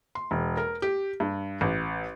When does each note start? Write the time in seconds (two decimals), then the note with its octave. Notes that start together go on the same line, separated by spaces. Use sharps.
0.15 C6
0.31 E1
0.57 A#4
0.82 G4
1.20 G2
1.61 A1